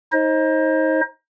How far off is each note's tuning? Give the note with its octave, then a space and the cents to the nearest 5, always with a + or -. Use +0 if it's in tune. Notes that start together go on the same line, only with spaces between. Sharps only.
D#4 +25 C5 +30 D#5 +15